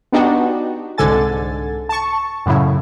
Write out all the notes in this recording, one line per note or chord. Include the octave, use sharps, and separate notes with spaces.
B3 D4 D#4 F#4 G4
C2 G#2 D3 A4 G#5 A6
A5 C#6
F#2 A2 C#3 E4